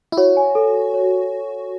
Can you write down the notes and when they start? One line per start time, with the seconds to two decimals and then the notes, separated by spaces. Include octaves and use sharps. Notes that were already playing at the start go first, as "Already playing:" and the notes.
0.12 E4
0.17 F#4 C#5
0.37 G#5
0.55 A4
0.75 A4
0.94 C#5